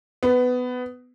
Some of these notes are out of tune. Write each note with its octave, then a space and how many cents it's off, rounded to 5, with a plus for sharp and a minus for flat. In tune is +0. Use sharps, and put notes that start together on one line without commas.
B3 +15